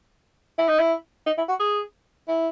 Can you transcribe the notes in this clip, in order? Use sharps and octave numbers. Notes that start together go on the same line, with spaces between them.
E4
D#4
E4
D#4
E4
F#4
G#4
E4